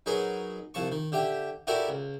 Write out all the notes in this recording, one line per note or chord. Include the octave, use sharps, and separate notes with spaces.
F#3 D#4 G#4 A#4 B4
C2 F3 A5 C#6
D#3
D3 G4 E5 G5
E4 F#4 G4 A4 A#4 D5
C#2